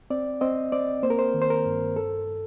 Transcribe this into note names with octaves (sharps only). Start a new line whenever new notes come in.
C4 D5
C4 D#5
C4 D5
A#3 C5
A#4
C5
D#3
C5
A#4
G2
A4